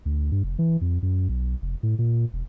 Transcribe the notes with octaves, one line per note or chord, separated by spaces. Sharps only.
D2
G2
F1
E3
F2
F#2
B1
F1
A2
A#2
E1